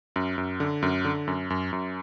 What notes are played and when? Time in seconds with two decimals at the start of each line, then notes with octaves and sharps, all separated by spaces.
0.16 F#2
0.38 F#2
0.60 D3
0.82 F#2
1.05 D3
1.27 F#2
1.50 F#2
1.73 F#2